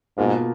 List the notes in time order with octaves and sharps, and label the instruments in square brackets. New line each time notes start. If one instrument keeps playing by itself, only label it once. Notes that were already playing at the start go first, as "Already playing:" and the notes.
[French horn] G#2 [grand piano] B2 A#3 F4